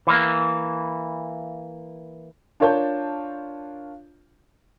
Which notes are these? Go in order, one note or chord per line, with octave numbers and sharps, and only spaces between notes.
E3 A#3
D4 F4 A#4 C#5 A5 G6